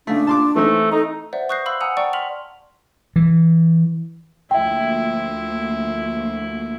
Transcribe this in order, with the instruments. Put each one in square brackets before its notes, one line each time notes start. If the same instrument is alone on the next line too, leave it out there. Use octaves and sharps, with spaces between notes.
[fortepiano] C#3 A3 [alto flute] D4
[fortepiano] A5 C6 D6
[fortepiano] E3 C4 D#4 [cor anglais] A3
[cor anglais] D#4 [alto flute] A4
[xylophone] B4 C5 D5 E5 F#5
C#6 D#6 F#6 G6 A#6 C7
F5 B5 C6 E6 F#7
F#5 G#5 A#5 D#6 E6 C#7
D5 F#5 G5 A5 C#6
C6 F6 B6 F7 F#7
[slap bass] E3
[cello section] D2 F3 A#3 [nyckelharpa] E4 [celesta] E5 G5